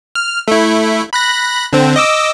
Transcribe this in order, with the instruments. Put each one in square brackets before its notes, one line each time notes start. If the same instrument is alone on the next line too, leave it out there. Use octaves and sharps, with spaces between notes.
[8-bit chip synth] F6
A3 E4
B5 F#6 A#6
D3 C4
D#5 D6 E6